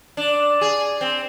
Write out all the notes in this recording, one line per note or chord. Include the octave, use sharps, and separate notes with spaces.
D4
G#4
C4